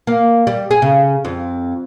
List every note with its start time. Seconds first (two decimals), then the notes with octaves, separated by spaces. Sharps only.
0.07 A#3
0.47 G3
0.71 G#4
0.82 C#3
1.25 F2